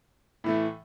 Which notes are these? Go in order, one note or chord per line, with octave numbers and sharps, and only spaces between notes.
A2 E3 A3